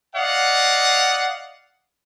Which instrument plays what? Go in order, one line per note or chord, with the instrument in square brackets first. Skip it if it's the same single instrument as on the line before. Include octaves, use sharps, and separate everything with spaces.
[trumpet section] D5 D#5 F5 F#5